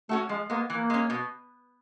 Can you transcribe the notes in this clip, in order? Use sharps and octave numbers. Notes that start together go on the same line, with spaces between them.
A3 C#4 F#4 A4
F3 G#3
G#3 A#3 B3
E3 A#3
G#3 C#4
B2